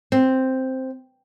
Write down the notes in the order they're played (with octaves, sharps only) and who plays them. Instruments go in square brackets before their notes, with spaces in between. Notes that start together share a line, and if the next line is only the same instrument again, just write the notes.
[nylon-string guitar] C4